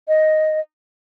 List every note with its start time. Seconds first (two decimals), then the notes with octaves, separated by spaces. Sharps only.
0.08 D#5